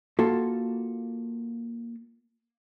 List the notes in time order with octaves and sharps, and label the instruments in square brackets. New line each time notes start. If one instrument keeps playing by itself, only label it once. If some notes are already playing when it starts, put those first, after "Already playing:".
[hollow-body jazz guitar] A#3 F4 F#4 A4